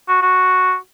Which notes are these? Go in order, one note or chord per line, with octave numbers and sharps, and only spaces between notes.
F#4
F#4